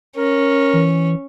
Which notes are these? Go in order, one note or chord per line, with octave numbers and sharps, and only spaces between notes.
C#4 A#4
E3